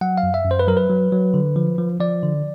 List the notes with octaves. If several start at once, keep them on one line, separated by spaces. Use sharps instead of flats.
F#3 F#5
F5
F#2
E5
F#2
C5
B4
F#3 A#4
B4
F#3
F#3
D3
F3
F3
F3 D5
D3